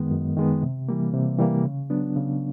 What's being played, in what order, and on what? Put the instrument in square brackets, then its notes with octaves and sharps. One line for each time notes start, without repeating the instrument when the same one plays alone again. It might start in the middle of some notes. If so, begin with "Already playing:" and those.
Already playing: [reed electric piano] F#2 D#3 G#3 B3
F#2
D#3 G#3 B3
C3
E3 G3 A#3
C3
E3 G3 A#3
C#3
F#3 B3 D4
C#3